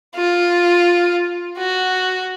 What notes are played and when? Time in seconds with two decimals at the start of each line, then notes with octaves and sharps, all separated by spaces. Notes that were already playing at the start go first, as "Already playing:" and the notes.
0.15 F4
1.58 F#4